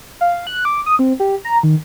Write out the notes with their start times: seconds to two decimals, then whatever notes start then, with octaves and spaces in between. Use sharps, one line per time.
0.21 F5
0.47 F#6
0.65 D6
0.86 D#6
0.99 C4
1.20 G4
1.45 A#5
1.63 D#3